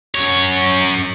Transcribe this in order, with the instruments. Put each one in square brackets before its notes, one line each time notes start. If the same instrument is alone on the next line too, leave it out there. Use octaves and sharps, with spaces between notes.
[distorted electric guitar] F#2 C#5